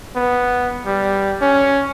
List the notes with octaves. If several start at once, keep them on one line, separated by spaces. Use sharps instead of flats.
B3
G3
C#4